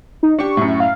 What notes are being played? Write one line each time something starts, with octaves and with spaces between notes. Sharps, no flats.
D#4
D4 G4 C#6
F#2 A2
F5